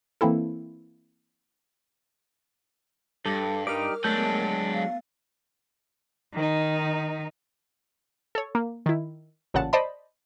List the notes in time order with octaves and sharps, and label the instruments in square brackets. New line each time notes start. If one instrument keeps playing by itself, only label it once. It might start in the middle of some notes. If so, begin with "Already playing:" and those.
[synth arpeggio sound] E3 A#3 C4 E4 A4
[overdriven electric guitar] G2 [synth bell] G3 [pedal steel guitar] A4
[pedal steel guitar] D#4 G4 D5 [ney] A#4 [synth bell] D6 F6
[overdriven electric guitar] F#3 D4 [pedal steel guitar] G#3 A5 G6 [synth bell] A3 B3 A6
[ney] F5
[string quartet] D#3 D#4
[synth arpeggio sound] A4 C#5
A#3
D#3 E4
A1 A#2 C#3 F#5 A5
C5 D5 D#5 A5 B5